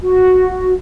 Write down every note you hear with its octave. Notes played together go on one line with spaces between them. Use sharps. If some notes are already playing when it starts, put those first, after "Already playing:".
F#4